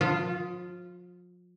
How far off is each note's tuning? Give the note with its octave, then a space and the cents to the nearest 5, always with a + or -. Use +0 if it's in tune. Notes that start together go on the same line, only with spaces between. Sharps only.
F3 +35 F4 -10